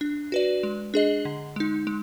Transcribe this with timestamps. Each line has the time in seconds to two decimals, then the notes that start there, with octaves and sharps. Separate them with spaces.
0.01 D4
0.32 F#4 B4 D5
0.63 G#3
0.94 D4 G#4 D#5
1.25 D3
1.56 G#3 D#4
1.87 G#3